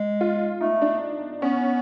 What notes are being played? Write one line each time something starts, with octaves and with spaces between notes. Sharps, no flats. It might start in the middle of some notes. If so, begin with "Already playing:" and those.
Already playing: G#3
F4
A3 D#4
D4
B3 C#4